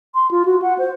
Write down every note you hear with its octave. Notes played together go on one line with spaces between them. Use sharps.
C6
F4
F#4
F#5
C5